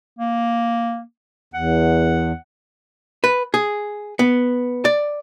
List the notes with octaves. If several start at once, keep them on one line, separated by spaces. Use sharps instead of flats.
A#3
E2 F#5
B4
G#4
B3
D5